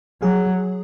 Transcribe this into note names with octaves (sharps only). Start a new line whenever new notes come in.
F#3 G#4